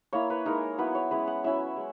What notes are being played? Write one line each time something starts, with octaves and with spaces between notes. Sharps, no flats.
A#3 E4 C#5
B4
G#3 D#4 A#4
F#3 B3 E4 B4
C#5
G#3 C#4 E4 B4
F#5
F#3 C#4 E4 E5
G#3